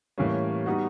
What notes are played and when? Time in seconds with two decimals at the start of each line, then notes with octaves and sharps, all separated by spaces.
0.18 A2 E3 G3 A#3 C#4
0.66 G3 B3 D#4 F#4